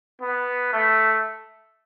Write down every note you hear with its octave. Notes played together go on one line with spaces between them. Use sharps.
B3
A3